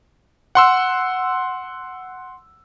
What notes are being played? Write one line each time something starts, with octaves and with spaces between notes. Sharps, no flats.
F#5 C6 E6